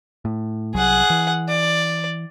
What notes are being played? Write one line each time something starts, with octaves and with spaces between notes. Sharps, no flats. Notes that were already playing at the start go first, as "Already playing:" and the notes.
A2
C2 F#3 G#4 F#5
E3
D5